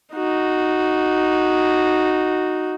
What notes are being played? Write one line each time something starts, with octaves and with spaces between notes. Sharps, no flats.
D#4 F#4